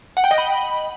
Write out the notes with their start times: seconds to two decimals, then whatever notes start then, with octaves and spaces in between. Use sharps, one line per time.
0.17 F#5
0.24 G5
0.31 D#5
0.38 B5